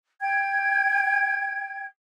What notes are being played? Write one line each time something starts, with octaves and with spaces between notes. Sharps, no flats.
G5 G#6